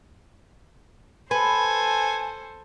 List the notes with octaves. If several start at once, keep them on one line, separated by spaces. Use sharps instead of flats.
A4 B4 C5 G#5